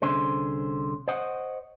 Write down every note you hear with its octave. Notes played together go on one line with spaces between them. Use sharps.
C2 D3 C#4 G#4 C5
C5 C#5 D#5 F#5